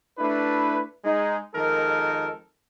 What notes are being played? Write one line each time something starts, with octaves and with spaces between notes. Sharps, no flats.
A3 D4 E4 B4
G#3 D#4
F2 D#3 G#3 A4 A#4